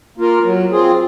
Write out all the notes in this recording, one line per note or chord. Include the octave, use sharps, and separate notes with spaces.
A#3 F4 A#4
F#3
C4 F4 G#4